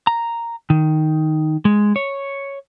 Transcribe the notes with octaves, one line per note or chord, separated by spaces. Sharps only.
A#5
D#3
G#3
C#5